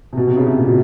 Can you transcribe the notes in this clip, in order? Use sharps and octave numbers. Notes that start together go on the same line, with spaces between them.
C3
B2
C3
C#3
C3
A#2
B2